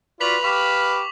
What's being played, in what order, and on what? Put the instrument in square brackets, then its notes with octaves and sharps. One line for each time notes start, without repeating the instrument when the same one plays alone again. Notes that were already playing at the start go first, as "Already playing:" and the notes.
[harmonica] F4 F#4 D5 [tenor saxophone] B4 [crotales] B6 F7 F#7
[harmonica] G4 F5 B5 [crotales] C#6 D6